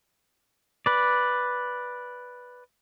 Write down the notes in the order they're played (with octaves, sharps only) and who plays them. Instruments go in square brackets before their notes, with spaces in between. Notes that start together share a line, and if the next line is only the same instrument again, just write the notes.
[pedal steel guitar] B4 D5